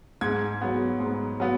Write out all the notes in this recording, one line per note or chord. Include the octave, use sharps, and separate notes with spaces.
G#2 G#6
F#3 B3
G#2
F#3 B3